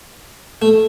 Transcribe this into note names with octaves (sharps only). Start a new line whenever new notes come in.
A3